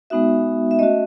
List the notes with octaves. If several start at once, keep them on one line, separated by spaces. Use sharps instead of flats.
G#3 B3 D#4 F#4 E5
E5
A3 C#4 F#4 D#5